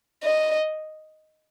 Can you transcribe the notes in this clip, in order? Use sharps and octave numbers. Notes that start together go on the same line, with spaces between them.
D#5